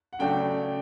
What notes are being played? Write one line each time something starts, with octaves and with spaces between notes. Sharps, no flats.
F#5
C#3 F#3 A3 D4 G5